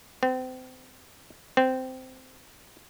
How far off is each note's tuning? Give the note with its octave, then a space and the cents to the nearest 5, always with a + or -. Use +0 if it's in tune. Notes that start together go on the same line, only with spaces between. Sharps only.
C4 -35
C4 -15